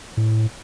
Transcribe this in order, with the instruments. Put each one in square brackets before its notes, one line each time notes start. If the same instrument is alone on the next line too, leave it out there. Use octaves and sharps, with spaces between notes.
[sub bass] A2